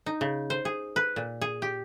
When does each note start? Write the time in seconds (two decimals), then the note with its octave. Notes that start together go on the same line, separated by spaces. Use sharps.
0.06 D#4
0.21 C#3
0.50 C5
0.65 G#4
0.96 B4
1.16 A#2
1.41 G#4
1.62 G4